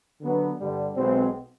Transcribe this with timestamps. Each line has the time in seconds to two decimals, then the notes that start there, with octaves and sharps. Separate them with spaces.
0.21 D3 F#3 B3 D4
0.59 G2 D3 G3
0.96 B1 B2 G#3 C4